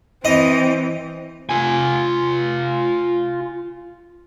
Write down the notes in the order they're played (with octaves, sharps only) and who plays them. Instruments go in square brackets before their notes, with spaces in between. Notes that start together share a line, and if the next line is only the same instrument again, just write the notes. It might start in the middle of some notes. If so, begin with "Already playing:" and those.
[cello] E3 [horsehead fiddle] C4 [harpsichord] D#5
[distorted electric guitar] F4 G#5